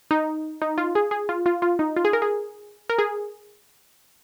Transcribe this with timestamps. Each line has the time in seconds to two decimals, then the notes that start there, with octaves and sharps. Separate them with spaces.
0.11 D#4
0.62 D#4
0.78 F4
0.95 G#4
1.11 G#4
1.29 F4
1.46 F4
1.62 F4
1.79 D#4
1.96 F4
2.05 G#4
2.13 A#4
2.22 G#4
2.90 A#4
2.98 G#4